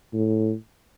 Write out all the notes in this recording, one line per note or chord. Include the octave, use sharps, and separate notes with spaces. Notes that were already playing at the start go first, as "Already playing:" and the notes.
A2